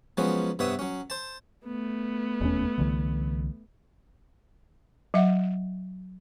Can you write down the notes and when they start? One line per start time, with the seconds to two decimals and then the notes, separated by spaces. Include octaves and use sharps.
0.17 F3 F#3 G#3 B3 C#4
0.59 G2 C3 B3 C#5 E5 D#6
0.79 F#3 C#4
1.10 C5 A5
1.65 A3 B3
2.41 E1 D#2 C#4
2.78 C2 D3 E3
5.14 F#3 E5 F#5